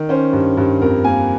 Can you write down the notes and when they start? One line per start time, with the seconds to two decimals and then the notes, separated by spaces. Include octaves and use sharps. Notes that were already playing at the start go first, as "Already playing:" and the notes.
Already playing: D#3
0.09 C#4 C5
0.33 G2
0.57 G2
0.81 F2 A#4
1.04 A#3 G#5